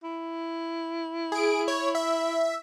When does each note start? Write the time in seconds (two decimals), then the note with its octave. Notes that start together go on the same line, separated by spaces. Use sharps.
0.03 E4
1.32 G#4 D7
1.68 C#5
1.95 E5